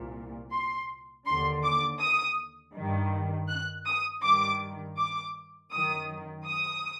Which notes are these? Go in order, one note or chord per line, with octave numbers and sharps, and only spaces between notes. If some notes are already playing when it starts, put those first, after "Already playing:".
Already playing: C2 A#2
C6
D#2 D3 C6
D6
D#6
G2 D#3
F#6
D#6
G2 D#3 D6
D6
F#2 D#3 D#6
D#6